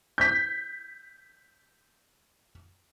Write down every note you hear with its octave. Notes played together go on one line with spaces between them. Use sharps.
G6 B6